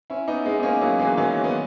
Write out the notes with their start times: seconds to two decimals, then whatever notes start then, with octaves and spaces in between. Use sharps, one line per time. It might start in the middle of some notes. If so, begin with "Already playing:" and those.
0.10 C#4 E4
0.28 B3 D#4
0.45 G#3 B3
0.60 D#4
0.63 A#3 C#4
0.81 F#3 A#3
0.99 E3 G#3
1.17 D#3 F#3
1.44 B3